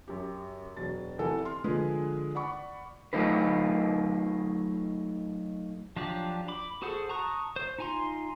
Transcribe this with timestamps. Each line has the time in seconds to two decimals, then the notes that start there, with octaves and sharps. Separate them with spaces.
0.08 F#2 G4
0.77 E1 F#3 A6
1.18 F1 E3 A4 F#5 G#5
1.45 C6 F6
1.64 D3 F3 G#3 G#4 B4
2.35 D5 F#5 B5 C#6
3.13 F#3 A3 D#4 F4 B4
5.96 F3 F#3 D4 G4 D5
6.48 B5 D6
6.82 F#4 G#4 A4 C5 F#5
7.09 A5 A#5 C#6 D#6 F#6
7.56 C5
7.78 D#4 F4 G#5 A#5 C6